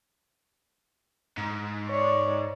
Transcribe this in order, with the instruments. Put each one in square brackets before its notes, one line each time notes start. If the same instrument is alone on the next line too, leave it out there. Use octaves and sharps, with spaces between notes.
[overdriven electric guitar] G#2
[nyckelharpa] C#5 D5